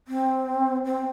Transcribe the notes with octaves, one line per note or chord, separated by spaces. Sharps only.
C4
C4